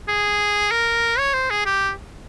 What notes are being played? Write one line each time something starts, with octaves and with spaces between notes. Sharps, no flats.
G#4
A#4
C#5
C5
G#4
G4